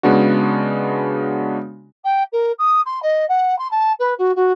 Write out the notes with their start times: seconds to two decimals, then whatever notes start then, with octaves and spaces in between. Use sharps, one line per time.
0.03 C#3 G#3 B3 D4 F#4
2.04 G5
2.32 A#4
2.58 D#6
2.85 C6
3.02 D#5
3.29 F#5
3.58 C6
3.71 A5
3.99 B4
4.18 F#4
4.35 F#4